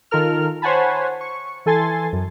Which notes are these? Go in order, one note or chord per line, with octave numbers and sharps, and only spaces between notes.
D#3 F4 A4 A#4 F6
C5 C#5 F#5 G#5 A5 B5
C#6
E3 A4 G#5 C6 A6
F#2